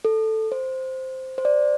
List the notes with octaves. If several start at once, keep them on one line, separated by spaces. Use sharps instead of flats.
A4
C5
C5
D5